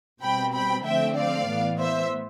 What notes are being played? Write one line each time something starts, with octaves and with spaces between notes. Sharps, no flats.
B2 G3 C4 G5 B5
G5 B5
D3 F3 A3 C4 E5 G5
D5 F5
A2 E3 B3
C5 E5